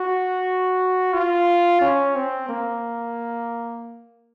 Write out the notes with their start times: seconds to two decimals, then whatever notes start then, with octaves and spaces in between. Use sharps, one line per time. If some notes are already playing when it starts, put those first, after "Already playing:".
Already playing: F#4
1.13 F4
1.81 C#4
2.15 C4
2.49 A#3